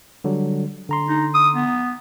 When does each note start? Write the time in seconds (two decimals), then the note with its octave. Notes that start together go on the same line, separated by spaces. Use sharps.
0.24 D3 F#3 G3
0.89 D3 A#5 C6
1.08 D#4
1.35 D#6
1.55 B3